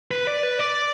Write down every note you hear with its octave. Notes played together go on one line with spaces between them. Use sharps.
B4
D5
B4
D5